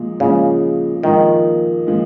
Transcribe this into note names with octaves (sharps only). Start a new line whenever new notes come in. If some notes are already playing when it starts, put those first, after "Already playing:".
Already playing: A#2 F3 G#3
A#2 C#3 F3 G#3
A#2 D#3 F3 G#3
A#2 F3 G#3